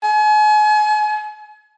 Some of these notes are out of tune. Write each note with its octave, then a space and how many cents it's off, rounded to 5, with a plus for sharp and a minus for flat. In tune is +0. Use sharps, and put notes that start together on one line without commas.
G#5 +40